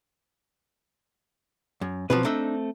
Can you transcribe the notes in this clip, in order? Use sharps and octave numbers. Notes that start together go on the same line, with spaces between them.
F#2
B2 F3 F#3 C4 F#4 B4
A3 C4 D4 D#4 A4 E5